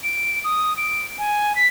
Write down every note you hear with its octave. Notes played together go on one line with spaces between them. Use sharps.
D7
D#6
D7
G#5
B6